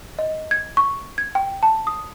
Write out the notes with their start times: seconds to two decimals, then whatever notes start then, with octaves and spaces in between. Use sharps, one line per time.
0.19 D#5
0.51 G#6
0.77 C#6
1.18 G#6
1.35 G5
1.63 A5
1.87 D#6